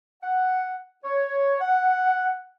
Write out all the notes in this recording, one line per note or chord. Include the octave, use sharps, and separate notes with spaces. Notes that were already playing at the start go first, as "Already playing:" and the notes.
F#5
C#5
F#5